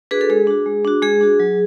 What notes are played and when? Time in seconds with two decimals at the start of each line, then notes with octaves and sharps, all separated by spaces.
0.11 D4 F#4 G#4 B4
0.21 A4
0.30 G#3 G#4
0.47 D4 F#4
0.66 G#3
0.85 D4 F#4
1.02 G#3 G#4
1.21 D4 F#4
1.40 F#3